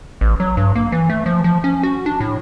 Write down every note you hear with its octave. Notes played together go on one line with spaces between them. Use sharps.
A1
F#3
G2
A#3
E3
A3
F3
F3
C#4
F#4
D4
A2